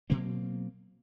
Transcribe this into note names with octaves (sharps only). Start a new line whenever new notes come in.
B2 F#3 A#3 C4